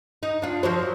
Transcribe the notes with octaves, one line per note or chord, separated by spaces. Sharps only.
D#4
D4 F4
F3 F#3 C5